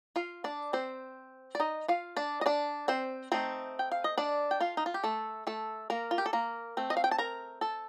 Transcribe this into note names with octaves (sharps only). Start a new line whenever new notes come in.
F4 F5
D4 D5
C4 C5
D5
D#4 D#5
F4 F5
D4 D5
D#5
D4 D5
C4 C5
A3 C4 D#4 C5
G5
F5
D#5
D4 D5
G5
F4 F5
D#4
F4
G4
A3 A4
A3 A4
A#3 A#4
F4
G4
A4
A#3 A#4
A3 C4
D#5
F5
G5
A5
A#4 A#5
A4 A5